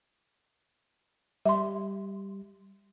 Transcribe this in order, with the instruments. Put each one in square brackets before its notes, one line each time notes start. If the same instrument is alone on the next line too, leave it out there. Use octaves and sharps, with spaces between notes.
[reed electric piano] G3 [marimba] E5 C6